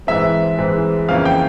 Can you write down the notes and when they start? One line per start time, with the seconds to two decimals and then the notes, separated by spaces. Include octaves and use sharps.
0.07 G#2 E3 G#3 C4 E5
0.58 G#2 E3 G#3 C4
1.09 F2 C#3 E3 A#3 C#4 F5
1.25 G5